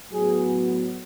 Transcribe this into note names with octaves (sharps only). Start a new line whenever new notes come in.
A2 F#3 B3 G#4